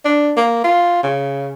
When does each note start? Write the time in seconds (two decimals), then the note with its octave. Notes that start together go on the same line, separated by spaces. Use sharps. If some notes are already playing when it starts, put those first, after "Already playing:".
0.05 D4
0.37 A#3
0.64 F4
1.03 C#3